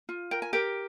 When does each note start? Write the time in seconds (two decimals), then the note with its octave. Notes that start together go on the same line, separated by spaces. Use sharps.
0.09 F4
0.31 A#4 G5
0.42 G#5
0.53 G4 A#4 G5